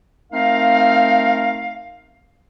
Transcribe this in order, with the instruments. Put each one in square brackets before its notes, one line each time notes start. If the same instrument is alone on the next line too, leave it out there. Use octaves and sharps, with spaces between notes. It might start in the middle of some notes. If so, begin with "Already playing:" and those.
[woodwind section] A3 C4 D#4 A#4 F5